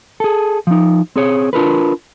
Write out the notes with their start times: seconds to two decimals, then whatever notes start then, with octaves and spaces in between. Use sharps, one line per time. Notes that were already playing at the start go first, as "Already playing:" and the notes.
0.20 G#4 A4
0.67 F3 D#4
1.16 C4 G#4 C#5
1.53 D4 F4 A#4 B4